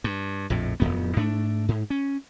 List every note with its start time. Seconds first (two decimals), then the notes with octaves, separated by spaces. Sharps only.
0.04 G2
0.50 A#1 F2 A2
0.80 D1 G#1 F2 B3
1.16 G#2 A3 D4
1.68 G#2
1.90 C#4